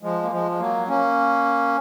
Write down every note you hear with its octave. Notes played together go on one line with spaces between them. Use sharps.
F3 G#3
A#3
F3 G#3
G#3
F#3 A#3
A#3 C#4